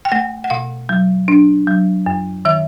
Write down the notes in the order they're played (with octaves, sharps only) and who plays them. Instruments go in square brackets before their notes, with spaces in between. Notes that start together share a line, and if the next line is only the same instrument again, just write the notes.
[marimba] G5
A3 F#5
F#5
B2 F5
F#3
D4
F#3
F#2
D#3 E5